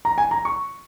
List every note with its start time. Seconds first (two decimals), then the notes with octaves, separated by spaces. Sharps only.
0.05 A#5
0.18 G#5
0.31 A#5
0.45 C#6